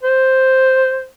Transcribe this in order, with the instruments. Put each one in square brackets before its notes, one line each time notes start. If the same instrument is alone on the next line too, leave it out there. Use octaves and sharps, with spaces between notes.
[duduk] C5